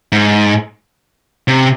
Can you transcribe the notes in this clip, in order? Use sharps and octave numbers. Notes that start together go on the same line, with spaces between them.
G#2
C3